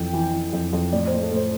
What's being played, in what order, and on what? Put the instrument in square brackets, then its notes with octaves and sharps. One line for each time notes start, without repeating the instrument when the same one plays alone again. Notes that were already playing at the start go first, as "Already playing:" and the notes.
Already playing: [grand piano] F2 E3 G5
E3
E3
F2
F2
A2 D5
A2 C5
A4
A2 C5